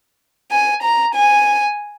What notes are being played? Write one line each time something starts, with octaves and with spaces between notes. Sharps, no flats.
G#5
A#5
G#5